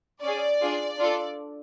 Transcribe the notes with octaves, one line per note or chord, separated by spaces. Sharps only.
C#4 G#4 D5
D4 F4 G#4
D4 F4 A4